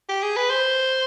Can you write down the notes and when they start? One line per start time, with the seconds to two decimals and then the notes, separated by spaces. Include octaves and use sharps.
0.09 G4
0.23 G#4
0.37 B4
0.50 C5